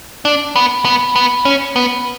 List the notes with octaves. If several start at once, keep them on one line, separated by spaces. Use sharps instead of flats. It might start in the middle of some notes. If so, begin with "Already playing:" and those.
D4
B3
B3
B3
C#4
B3